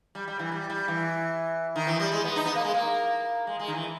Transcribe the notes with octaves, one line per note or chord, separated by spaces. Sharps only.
G3
G3
E3
G3
G3
E3
D#3
E3
G3
G#3
B3
D#4
B3
A#3
G#3
A#3
G#3
G#3
D#3
E3